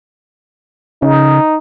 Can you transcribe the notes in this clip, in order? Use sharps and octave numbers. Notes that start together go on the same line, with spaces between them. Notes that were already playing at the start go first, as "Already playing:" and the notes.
C#3 D#4